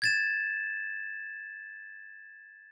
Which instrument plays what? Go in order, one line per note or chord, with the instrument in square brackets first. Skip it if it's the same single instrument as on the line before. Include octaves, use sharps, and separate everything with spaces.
[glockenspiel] G#6 A6 E7